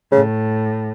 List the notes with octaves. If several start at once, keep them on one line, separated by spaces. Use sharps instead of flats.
A2 C#3